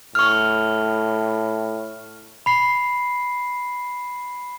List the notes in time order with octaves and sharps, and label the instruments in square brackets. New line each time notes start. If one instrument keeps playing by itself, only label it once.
[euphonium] A2 [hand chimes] C#6 F6
[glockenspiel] B5 C7